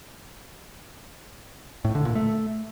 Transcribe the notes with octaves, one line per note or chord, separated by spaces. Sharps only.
A2
D3
A#2
A3